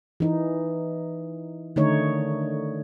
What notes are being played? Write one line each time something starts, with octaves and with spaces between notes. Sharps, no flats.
E3 D#4
D3 D#3 A3 D#4 C#5